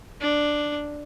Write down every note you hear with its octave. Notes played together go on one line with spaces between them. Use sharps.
D4